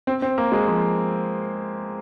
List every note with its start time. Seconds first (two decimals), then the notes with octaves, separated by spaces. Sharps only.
0.07 C4
0.22 C4
0.38 A#3
0.52 G#3
0.67 F3